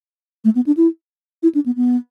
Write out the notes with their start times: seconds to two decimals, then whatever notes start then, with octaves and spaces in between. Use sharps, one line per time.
0.45 A3
0.55 B3
0.67 D4
0.77 E4
1.43 E4
1.55 D4
1.66 B3
1.76 B3